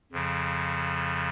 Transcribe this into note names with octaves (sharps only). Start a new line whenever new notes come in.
F2 C#3 F3